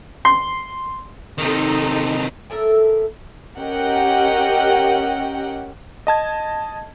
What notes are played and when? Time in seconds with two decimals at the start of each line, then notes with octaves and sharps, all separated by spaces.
0.25 C6
1.38 C3 D#3 D#4 A4
2.50 A2 A4 A#4 E5
3.57 C#4 G4 A#4 D#5 F#5 G5
6.07 D#5 A5 G#6